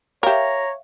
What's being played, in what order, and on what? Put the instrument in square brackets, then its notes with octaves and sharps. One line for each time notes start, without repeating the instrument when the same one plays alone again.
[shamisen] G4 A#4 [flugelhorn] C#5 [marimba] E5 F5 [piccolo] A#5